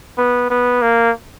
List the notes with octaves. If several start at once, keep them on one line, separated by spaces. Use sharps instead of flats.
B3
B3
A#3